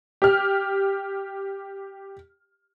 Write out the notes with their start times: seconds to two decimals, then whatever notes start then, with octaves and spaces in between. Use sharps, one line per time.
0.22 G4 F6